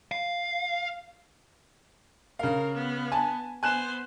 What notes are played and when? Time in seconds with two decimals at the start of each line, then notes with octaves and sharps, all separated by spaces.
0.12 F5
2.39 C#3 A#4 F5
2.75 B3
3.12 G#5 A5
3.63 B3 C5 G#5 F#6 E7